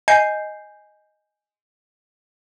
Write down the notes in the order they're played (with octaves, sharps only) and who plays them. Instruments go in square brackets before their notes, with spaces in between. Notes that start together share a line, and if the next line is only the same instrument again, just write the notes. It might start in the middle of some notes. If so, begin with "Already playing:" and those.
[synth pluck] D#5 G#5 G6 C7